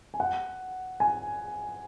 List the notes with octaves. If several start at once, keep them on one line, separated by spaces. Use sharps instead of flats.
G#5
F#5
G#5